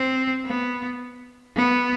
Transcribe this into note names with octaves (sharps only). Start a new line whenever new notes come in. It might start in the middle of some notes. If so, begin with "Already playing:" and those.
Already playing: C4
B3
B3